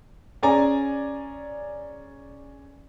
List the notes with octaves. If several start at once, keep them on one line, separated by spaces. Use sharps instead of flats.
C#4 G#4 D5 G#5 A#5